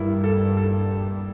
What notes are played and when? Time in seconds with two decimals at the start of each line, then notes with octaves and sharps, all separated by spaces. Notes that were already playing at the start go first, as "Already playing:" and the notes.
Already playing: G2 A#3 E4
0.24 A4
0.57 A4